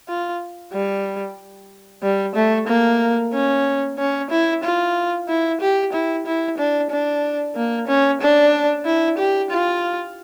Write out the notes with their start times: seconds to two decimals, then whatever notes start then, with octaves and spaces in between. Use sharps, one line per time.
0.09 F4
0.73 G3
2.03 G3
2.35 A3
2.68 A#3
3.34 C#4
3.99 C#4
4.31 E4
4.63 F4
5.29 E4
5.61 G4
5.93 E4
6.26 E4
6.58 D4
6.90 D4
7.56 A#3
7.88 C#4
8.21 D4
8.86 E4
9.18 G4
9.51 F4